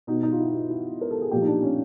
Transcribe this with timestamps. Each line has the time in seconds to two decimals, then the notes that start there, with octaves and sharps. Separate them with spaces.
0.07 B2 D#4
0.23 D#4
0.32 F4
0.39 E4
0.54 E4
0.70 E4
1.01 A#4
1.11 A4
1.21 G#4
1.31 A#2 F3 G4
1.42 D#4
1.47 D4
1.63 C#4